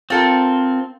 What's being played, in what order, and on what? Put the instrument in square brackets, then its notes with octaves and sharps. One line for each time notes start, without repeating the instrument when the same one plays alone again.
[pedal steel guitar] C4 [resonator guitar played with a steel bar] F4 A4 A#4